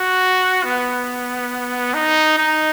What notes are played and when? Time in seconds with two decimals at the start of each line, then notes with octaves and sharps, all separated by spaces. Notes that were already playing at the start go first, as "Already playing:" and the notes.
Already playing: F#4
0.64 B3
1.94 D#4
2.38 D#4